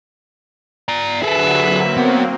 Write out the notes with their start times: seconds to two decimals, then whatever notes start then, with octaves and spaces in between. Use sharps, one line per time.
0.88 D5 A#5
1.23 D3 F#3 G#4 A4 B4 E5 F#5
1.59 F#3 A#3 C4
1.98 B3